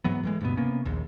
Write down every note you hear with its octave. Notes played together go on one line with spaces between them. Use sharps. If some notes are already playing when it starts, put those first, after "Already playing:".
G#2 E3 F#3 B3
A2 E3 G#3
D2 G2 B2 B3
C3 A#3 B3 C#4
A#1 D#2